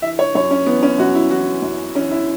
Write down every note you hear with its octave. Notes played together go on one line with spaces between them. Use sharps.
E3 E5
C#5
F#2 C#5
C#4
E3 B3
C#4
F#2 F#4
E4
E3 F#4
F#2
E3 C#4
E4